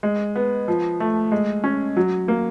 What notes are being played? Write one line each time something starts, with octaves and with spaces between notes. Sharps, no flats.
G#3
B3
F3
A3
G#3
C#4
F#3
A#3